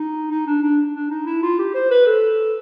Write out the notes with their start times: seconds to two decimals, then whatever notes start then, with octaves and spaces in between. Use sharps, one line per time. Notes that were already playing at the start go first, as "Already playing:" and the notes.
Already playing: D#4
0.31 D#4
0.47 D4
0.62 D4
0.94 D4
1.10 D#4
1.26 E4
1.42 F4
1.59 G4
1.74 C5
1.91 B4
2.06 A4